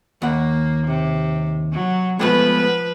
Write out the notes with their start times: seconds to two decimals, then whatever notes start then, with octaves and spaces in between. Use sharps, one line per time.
0.22 D#2 A#3 F#5
0.87 C3
1.72 F#3
2.19 F3 G#3 A3 B3 B4